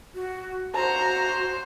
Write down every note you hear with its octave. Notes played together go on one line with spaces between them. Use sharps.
F#4
F#4 C5 A#5